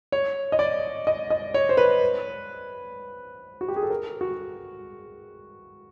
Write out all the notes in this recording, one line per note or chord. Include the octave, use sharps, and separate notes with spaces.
C#5
D#5
D5
D#5
D#5
C#5
C5
B4
F#4
G4
G#4
A4
A#4
F#4